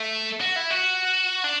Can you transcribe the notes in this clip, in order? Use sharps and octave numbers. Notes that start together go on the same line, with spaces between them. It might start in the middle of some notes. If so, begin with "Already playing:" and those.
Already playing: A3
F#4
E4
F#4
D4